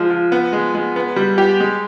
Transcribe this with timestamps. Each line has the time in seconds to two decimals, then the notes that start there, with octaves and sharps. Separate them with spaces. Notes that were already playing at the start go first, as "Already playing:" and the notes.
Already playing: F3 G#3
0.10 F3
0.32 B3
0.53 G#3
0.75 G#3
0.96 B3
1.16 G3
1.38 G4
1.60 G#3